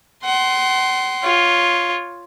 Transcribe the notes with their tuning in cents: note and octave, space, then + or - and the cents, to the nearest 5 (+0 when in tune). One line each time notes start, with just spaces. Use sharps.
F#5 +35 C6 +0
F4 +0 C#5 +0